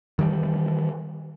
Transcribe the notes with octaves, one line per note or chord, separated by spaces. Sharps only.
D#3 E3 G3